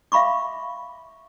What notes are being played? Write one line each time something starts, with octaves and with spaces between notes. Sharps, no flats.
E5 F5 B5 C#6 D6